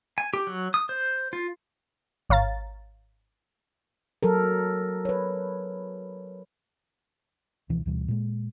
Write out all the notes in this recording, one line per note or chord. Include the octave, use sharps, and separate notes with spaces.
G#5
G4
F#3
D#6
C5
F4
G#1 C#5 F5 A#5 A6
F#3 A4 A#4
B4 C#5
C#2 B2 E3 F3
D2 B2 E3 G3
A#2 G#3